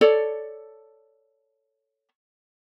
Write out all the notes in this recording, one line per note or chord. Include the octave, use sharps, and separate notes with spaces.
A4 C#5 D5